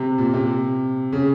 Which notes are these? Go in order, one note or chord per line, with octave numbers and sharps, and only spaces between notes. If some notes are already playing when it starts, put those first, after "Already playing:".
Already playing: C3
A#2
C3
C#3